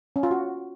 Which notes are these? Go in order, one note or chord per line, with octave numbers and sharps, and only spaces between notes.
C#4
F4
F#4